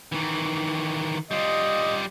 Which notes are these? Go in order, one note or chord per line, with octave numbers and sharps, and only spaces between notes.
D#3 E3
G3 F4 D#5